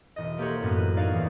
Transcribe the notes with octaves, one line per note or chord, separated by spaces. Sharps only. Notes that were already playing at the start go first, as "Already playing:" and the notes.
E1 D#5
A#3 G4 A4 C5 C#5 F#5
F#2 A2 B3
F#6 D#7
D#4 C#5 D5 F5
E2 E3 A#3